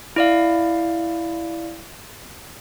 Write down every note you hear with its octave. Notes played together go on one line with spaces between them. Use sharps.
E4 D5 F5